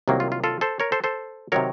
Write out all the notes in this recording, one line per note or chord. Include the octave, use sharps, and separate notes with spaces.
C2 C3 D#3 F#3 A#3
F4
F4
F4 A4
A4 C5
A#4 C#5
A4 C5
A4 C5
C3 D#3 F#3 A#4 C#5